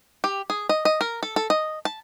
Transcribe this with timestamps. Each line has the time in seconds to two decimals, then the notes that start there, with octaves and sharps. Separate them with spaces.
0.24 G4
0.50 G#4
0.69 D#5
0.85 D#5
1.01 A#4
1.23 A4
1.36 A4
1.50 D#5
1.85 A5